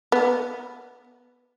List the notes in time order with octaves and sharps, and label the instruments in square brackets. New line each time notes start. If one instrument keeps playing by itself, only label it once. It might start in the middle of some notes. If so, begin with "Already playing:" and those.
[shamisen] B3